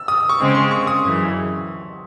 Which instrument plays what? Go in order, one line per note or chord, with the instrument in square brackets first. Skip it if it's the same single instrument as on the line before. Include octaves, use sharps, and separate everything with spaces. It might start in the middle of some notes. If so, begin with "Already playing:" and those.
Already playing: [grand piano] E6
D#6
C#6
[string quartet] C#3 G#3 C4
[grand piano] C6
C#6
D#6
[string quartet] F#2 C#3 E3